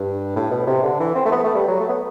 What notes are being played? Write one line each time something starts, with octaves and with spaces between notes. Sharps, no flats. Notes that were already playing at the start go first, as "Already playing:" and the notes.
Already playing: G2
A2
B2
C3
D3
E3
C4
A3
B3
A3
G3
F#3
A3
B3